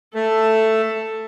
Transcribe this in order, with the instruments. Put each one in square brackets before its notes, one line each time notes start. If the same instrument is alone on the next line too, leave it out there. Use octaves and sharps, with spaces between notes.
[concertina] A3 [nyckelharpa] A4